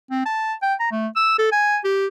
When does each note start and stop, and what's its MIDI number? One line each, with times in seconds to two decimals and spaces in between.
0.10 0.21 60
0.25 0.53 81
0.62 0.74 79
0.80 0.87 82
0.91 1.07 57
1.16 1.33 88
1.38 1.49 69
1.52 1.78 80
1.84 2.06 67